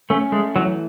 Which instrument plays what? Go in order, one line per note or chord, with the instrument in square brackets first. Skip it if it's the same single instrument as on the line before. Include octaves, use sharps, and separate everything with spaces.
[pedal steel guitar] A3 [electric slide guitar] C#4
[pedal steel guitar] G#3 [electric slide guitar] A3
[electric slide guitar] E3 [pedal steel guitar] F#3